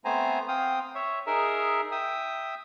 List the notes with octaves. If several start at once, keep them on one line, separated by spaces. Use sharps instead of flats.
A3 B3 C4 C5 G#5 A#5
C4 F5 G5 D#6
C#5 E5
D#4 G#4 A#4 E5
E5 G5 D#6